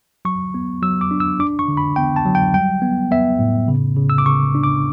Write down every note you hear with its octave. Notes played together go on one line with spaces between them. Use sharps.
F#3 C#6
B3
F#3 E6
D6
D4
E6
D4 D6
C#6
D3
B5
B3 G5
A5
F#3
G5
G3 G5
B3
B3 E5
A2
C#3
C#3
E6
D6
C#3 C#6
D4
D6